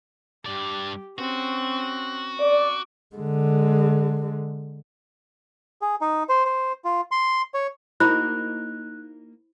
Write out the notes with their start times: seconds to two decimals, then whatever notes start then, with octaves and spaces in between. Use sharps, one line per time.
0.46 G2 G4 D5
1.18 C4 C#4 F#4
2.39 D5 D6
3.16 D3 G#3
5.82 G#4
6.01 D#4
6.29 C5
6.45 C5
6.85 F4
7.11 C6
7.54 C#5
8.00 A#3 D#4 E4 F#4 C5 B5 F#6